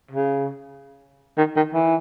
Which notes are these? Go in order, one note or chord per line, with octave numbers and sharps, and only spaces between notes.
C#3
D#3
D#3
E3